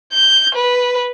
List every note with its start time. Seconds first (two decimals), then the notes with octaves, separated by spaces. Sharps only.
0.13 G6
0.55 B4